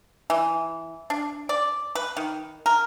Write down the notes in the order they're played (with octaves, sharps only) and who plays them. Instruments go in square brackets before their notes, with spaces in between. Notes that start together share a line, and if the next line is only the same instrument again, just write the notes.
[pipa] E3
D4
D5
B4
D#3
A#4